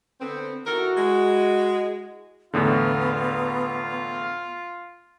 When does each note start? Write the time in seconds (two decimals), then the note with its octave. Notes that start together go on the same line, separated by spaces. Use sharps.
0.20 D3 B3 C4
0.66 D#3 E4 F#4 A4 A#4
0.97 G#3
2.54 E2 A2 D3 B3 F4